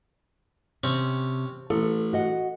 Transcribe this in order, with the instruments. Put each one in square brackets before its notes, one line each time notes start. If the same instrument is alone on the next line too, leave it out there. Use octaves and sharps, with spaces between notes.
[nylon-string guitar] C3 [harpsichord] C4 C#4
[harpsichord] A1 [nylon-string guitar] A4
[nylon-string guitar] F#4 D#5 F#5